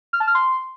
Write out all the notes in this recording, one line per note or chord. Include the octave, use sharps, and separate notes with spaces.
F6
A5
F6
C6